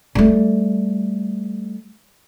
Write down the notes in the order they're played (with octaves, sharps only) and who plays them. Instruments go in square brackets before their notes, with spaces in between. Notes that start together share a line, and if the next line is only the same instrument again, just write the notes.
[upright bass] G3 A3